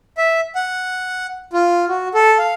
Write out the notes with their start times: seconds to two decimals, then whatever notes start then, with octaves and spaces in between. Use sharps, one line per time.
0.18 E5
0.55 F#5
1.53 F4
1.89 F#4
2.14 A4
2.38 F5